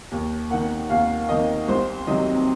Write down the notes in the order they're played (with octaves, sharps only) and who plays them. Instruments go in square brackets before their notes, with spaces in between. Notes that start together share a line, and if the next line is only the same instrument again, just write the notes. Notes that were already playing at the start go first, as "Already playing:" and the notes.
[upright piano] D#2
D#3 A#3 F#5
D#2 F5
D#3 A#3 D#5
C2 C5
C3 D#3 F#3 D#5